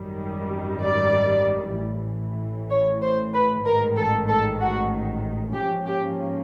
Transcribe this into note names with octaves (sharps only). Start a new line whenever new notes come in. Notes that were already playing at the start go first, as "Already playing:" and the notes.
Already playing: G#1 F#2 D#3 G3
D5
A1 A2 E3
C#5
C5
B4
A1 G#2 D#3 A#4
A4
A4
F#4
G#2 F3 A#3 C#4 G4
G4